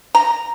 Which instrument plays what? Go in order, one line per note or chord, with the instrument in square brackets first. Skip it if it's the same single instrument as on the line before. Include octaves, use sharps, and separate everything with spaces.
[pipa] A#5